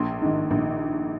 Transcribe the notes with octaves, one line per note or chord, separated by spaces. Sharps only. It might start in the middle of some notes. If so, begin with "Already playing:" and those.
Already playing: A#1 C6
G#2 D#3
A#1